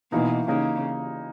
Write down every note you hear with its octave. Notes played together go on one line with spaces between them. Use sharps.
B2 E3 A#3 D#4
C#3 E3 A#3 D#4